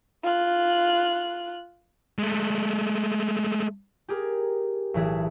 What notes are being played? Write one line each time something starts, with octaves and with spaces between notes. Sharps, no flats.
F4 F#6
G#3 A3
G4 G#4 A#4
B1 A2 E3 E4 G#4 E5